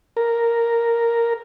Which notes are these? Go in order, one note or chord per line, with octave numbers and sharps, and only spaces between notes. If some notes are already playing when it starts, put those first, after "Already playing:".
A#4